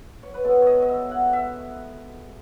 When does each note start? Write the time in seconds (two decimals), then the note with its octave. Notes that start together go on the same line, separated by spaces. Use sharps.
0.23 C#5
0.34 B4
0.44 B2 G#3 B3 A4
0.62 C#5 D#5
0.82 D#5
0.89 E5
1.11 F#5
1.33 E5